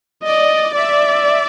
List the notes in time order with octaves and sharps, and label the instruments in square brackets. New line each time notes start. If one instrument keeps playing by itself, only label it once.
[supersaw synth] D5 [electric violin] D#5
[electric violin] D5 [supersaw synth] E5